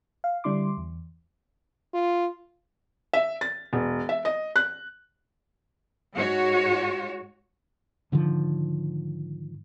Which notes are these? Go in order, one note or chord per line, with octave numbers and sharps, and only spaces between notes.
F5
D3 G3 D4 E4 C6 D6
E2
F4
E5
A6
E1
E5
D#5
F#6
G#2 F#4 C#5
G#2 D3 D#3 F3